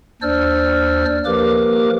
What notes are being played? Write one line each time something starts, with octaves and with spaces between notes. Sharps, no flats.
D#2 D4 C5 D5 E6 F6
F3 A#3 G4 A#4 B4 D6